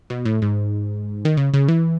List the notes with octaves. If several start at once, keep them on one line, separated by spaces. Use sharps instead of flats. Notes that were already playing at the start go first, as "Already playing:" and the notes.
B2
A2
G#2
D#3
C#3
C#3
E3